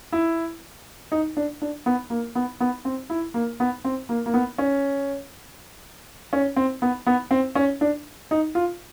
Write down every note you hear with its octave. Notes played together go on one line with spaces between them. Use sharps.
E4
D#4
D4
D4
B3
A#3
B3
B3
C4
E4
A#3
B3
C4
A#3
A#3
B3
C#4
C#4
C4
B3
B3
C4
C#4
D4
D#4
F4